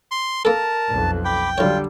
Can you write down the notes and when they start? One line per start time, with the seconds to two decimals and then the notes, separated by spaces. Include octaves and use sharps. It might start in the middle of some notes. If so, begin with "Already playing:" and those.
0.11 C6
0.45 A#3 A4 A#4 A5
0.88 B1 F2
1.25 G5 B5 D6
1.58 B1 D3 G3 F4 C#5